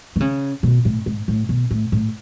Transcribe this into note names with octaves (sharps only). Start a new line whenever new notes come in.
D3
C#3
B2
A2
G#2
A2
B2
A2
A2